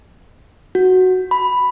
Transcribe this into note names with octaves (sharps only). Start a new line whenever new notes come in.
F#4
B5